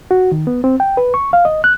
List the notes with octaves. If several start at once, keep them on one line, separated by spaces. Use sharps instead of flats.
F#4
D#3
B3
C4
G5
B4
C#6
F5
D#5
F#6